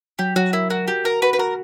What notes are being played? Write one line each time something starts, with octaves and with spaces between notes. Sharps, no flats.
F#3 G4
F#3 F#4
E4 A#4
F#4 A#4
F#4 G4
F#4 A#4
F#4 B4
B4
F#4 A#4